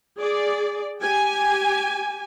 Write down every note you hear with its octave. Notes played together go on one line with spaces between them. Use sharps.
G#4 D5
G4 G#5